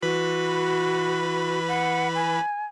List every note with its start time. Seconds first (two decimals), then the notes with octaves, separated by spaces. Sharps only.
0.03 E3 F#4 B4 B5
1.68 F#5
2.15 G#5